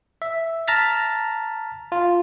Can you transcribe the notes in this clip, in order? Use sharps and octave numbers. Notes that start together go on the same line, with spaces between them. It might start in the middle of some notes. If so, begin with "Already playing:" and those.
E5
A5 A#5 F6 A6 B6
F4